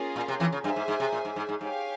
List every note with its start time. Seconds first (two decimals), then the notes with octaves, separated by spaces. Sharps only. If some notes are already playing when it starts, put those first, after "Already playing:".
Already playing: A#3 C#4 F4 G#4
0.16 A#2
0.28 C3
0.40 E2 E3
0.52 C#3
0.64 G2 G#4 C5 E5 G#5
0.76 G#2
0.88 G#2
1.00 C3
1.12 A#2
1.25 G#2
1.36 G#2
1.49 G#2
1.61 G#2 G4 C#5 F5 G#5